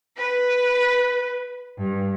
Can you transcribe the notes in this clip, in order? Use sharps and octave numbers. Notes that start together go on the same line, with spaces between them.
B4
G2